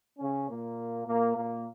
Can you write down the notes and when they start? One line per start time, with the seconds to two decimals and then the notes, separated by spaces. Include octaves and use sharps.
0.18 C#3 C#4
0.47 A#2 A#3
1.05 A#2 A#3
1.35 A#2 A#3